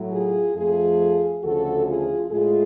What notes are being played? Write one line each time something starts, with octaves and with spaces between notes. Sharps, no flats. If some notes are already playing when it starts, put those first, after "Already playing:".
Already playing: A2 F#3 A3
F4 G#4
F2 F3 A3 F4 G#4
D2 C#3 F3 F#4 A4
F4 G#4
A2 G#3 F4 G#4